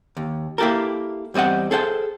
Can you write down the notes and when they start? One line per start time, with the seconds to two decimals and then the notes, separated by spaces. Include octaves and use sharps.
0.17 D#2
0.58 A#3 E4 G4 A4 A#4
1.34 E2 G3 C4 D#5 F#5
1.71 G#4 A4 C5 F#5 G5